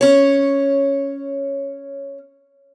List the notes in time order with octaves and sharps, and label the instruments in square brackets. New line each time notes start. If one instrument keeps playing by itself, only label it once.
[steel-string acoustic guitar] C#4 C#5